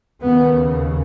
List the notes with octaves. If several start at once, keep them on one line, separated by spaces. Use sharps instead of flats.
D#2 C#3 B3